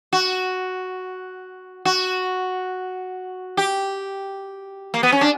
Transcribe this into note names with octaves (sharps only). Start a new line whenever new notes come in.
F#4
F#4
G4
A#3
B3
C#4
D4